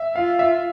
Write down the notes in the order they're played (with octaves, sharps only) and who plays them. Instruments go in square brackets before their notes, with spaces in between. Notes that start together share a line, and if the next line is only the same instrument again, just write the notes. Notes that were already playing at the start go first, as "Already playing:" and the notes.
Already playing: [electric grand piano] E5
[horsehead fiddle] F4 [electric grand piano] F5
[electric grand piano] E5